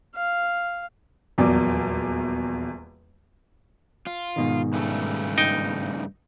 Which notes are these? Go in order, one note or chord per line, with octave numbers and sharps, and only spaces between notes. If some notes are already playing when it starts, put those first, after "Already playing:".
F5
D#1 E2 F#3 D5
F4
G#2 B2 D#3
G2 C#3 A3
D#4 G5